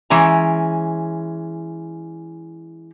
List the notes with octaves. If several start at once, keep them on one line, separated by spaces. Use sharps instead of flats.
E3 G#3 C#4 A#5